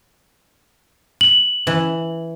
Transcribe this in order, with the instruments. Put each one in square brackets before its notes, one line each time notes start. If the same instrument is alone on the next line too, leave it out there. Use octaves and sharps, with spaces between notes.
[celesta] F#7
[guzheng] E3